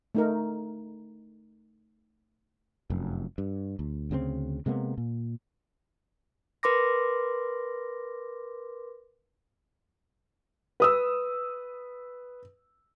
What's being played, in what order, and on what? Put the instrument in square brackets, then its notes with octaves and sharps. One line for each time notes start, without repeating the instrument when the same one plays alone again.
[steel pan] A3 D#4 A#4
[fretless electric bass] F1 F#2
G2
D2
D2 C#3 F3 C4
C3 G#3 A#3 B3
A#2
[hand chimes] A#4 B4 C6 D6 A#6
[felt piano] B4 D#6 E6